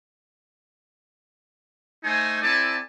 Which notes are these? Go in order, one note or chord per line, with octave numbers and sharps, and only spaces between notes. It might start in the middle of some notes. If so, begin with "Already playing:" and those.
A3 D#4 C5 G#5
C4 E4 A4 D5 G#5 A5